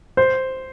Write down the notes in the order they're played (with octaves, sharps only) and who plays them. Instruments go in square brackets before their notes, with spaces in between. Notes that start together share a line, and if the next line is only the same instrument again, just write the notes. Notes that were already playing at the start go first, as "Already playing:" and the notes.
[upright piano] C5